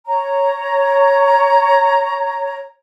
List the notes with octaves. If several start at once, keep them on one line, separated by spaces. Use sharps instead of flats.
C#5 A#5